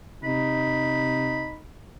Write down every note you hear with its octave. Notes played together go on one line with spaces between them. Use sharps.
C3 D#4 B5